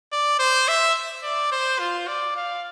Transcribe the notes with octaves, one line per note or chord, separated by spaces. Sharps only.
D5
C5
E5
D5
C5
F4
D5
F5